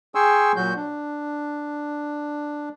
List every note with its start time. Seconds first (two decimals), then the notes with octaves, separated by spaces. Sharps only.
0.15 G#4 G5 G#5 C6 C#6 E6
0.56 A#2 F#3 F#4 G6
0.76 D4